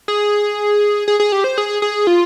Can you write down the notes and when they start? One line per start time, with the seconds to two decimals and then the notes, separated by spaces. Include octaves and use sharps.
0.08 G#4
1.08 G#4
1.20 G#4
1.32 G4
1.44 C5
1.58 G#4
1.82 G#4
2.07 F4